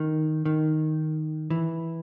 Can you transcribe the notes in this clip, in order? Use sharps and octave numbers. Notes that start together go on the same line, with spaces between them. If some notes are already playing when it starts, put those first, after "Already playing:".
Already playing: D#3
D#3
E3